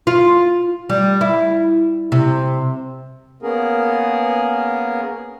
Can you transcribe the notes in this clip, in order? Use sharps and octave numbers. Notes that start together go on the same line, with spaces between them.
F4
G3
E4
C3
A#3 B3 C#4 G#4 A#4